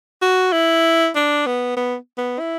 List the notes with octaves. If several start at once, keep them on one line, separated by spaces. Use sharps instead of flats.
F#4
E4
D4
B3
B3
B3
E4